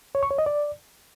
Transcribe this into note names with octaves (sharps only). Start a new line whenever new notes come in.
C#5
C#6
C#5
D#5
D5